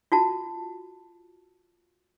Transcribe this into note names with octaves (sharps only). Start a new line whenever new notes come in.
F4 F#4 A5